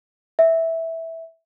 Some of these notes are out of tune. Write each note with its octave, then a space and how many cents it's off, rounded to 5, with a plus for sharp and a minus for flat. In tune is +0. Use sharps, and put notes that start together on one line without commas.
E5 -10